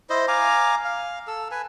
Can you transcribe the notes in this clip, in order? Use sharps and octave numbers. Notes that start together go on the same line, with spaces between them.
E4 C5 D#5
F5 G#5 A#5 D6
F5
A4 E6
B4 G#5